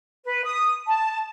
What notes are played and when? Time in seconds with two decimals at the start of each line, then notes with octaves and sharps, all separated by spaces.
0.25 B4
0.44 D#6
0.87 A5